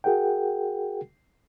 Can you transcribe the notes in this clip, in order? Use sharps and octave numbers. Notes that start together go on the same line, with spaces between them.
F#4 G#4 A#4 F#5 G5